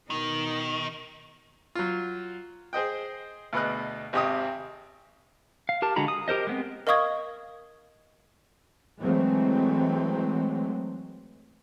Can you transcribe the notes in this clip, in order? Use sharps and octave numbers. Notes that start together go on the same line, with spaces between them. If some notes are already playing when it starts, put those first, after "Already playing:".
B2 D#3 D#4 A#4
F#3 F4
G#4 C5 D#5 G5
D2 B2 B3 G#4 D#5 F#6
G#1 C3 G4 D#5 D#6
F5
G4 A#4 A5
D3 G#3 F#4 A#5 B5
D#6
G4 A#4 C5 D#5
G#3 B3 C4
A#4 D#5 F5 C#6 D#6 G#6
E3 F#3 G#3 A3 C4